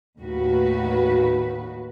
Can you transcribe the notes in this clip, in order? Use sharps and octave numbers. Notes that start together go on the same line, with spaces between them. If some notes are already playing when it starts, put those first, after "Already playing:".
D#2 A2 D#3 F#4 B4